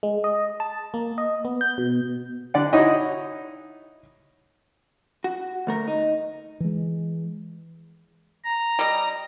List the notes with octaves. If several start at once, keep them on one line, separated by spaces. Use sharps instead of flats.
G#3
D#5
A5
A#3
D#5
B3
G6
B2
D3 D5 F#5
D#4 E4 F#4 C#5 D#5
F#4
D2 A3 A#4
D#4
E3 G#3
A#5
G3 D#5